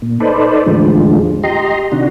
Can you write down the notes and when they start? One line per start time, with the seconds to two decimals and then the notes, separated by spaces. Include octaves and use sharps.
0.02 A#2
0.20 D#4 A4 B4 C5 D5
0.66 E2 A2 D3 F3 G#3
1.43 G4 D#5 A#5 C6
1.92 C3 D#3 D4 F#4